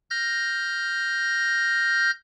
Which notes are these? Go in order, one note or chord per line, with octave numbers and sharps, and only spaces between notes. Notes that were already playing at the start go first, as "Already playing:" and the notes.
F6 G6 A#6